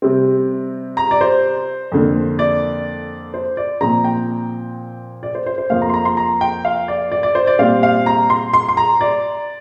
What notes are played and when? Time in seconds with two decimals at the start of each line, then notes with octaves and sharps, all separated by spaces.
0.02 C3 G3 C4
0.97 A#5
1.11 D5
1.21 C5
1.92 F2 D3 A#3
2.39 D5
3.34 C5
3.57 D5
3.81 A#2 F3 C4 A#5
4.04 G5
5.23 D5
5.35 C5
5.46 C5
5.58 C5
5.70 F2 F3 A#3 F5
5.82 A#5
5.89 C6
5.94 A#5
6.05 C6
6.17 A#5
6.41 G5
6.65 F5
6.88 D5
7.12 D5
7.23 D5
7.35 C5
7.47 D5
7.59 A#2 G3 C4 F5
7.83 F5
8.06 A#5
8.30 C6
8.53 C6
8.68 C6
8.77 A#5
9.01 D5